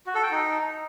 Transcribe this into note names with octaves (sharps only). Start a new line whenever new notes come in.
F#4
A4
G5
D#4